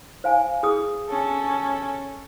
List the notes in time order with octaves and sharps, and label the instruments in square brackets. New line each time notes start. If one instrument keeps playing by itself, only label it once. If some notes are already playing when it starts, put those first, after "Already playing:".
[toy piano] C5 F5 G#5
G#4 D#6
[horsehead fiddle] C#4 A4